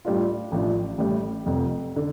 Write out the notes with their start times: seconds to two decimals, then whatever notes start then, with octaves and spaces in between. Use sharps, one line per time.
0.05 A2 G3 D4 F4
0.52 A1 A2 F3 D4 F4
0.98 A1 A2 G3
1.45 F1 F2 C3
1.96 D3